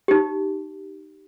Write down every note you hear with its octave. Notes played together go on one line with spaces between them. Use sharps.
D#4 G4